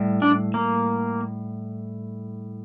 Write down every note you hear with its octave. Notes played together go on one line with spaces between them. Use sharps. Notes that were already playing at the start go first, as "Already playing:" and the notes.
Already playing: A2 G3
D4
A#3